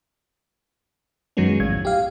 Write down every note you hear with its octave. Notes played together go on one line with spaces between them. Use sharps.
F#2 D#3 F#3 G#3 B3 C#4
A#1 A2 G#6
G4 F5